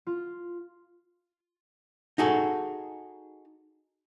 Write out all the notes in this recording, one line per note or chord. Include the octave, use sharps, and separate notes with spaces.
F4
D#4 F#4 G#4 A4